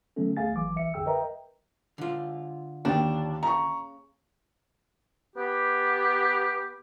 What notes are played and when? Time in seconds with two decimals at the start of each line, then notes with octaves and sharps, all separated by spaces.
0.16 D3 F#3 A3 B3 C#4 A4
0.37 D#2 A3 G#4 F5 G#5 A6
0.53 G#1 E3 F#3 D6
0.75 B1 E3 E5 C#7
0.94 A#1 F2 D3 G#4 G5 E6
1.06 A#4 B4 D#5 E5 G5 A#5
1.98 D3 F4
2.85 D#2 A#3 D4 G5
3.43 C#3 A#5 C#6
5.36 B3 G4